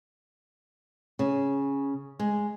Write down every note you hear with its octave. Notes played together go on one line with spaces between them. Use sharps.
C#3
G#3